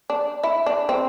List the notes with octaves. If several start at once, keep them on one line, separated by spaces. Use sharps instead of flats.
D4
E4
D4
C4